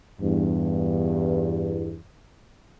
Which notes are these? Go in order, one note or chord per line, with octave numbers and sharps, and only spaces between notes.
E2 G2